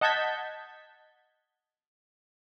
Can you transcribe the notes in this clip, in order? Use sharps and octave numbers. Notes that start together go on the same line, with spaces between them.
D#5 F#5 A5 G6 G#6 B6